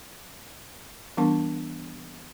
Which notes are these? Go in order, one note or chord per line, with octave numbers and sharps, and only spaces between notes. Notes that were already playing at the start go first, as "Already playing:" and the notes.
E3 G3 B3 D4 A#4 A5